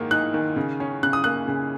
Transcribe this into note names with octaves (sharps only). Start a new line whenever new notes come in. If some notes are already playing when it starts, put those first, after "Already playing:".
Already playing: G#2 D#3 A#3
D#4 F#6
D#3
C#3
C#4
C#3 F#6
D#6
A#3 F#6
C#3